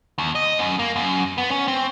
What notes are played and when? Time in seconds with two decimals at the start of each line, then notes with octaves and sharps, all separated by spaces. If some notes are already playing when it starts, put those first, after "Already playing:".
0.18 D#2
0.35 D#5
0.59 F#2
0.79 A#3
0.96 F#2
1.38 B3
1.51 C#4
1.68 C4